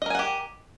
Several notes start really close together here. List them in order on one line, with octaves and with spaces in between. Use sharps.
D#5 A#4 G#5 F#5 G4